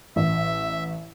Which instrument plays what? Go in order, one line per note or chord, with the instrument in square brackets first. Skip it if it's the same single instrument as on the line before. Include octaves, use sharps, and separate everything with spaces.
[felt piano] A1 [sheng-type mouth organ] E5